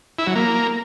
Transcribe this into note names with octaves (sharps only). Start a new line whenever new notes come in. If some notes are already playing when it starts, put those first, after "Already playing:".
E4
F#3
A#3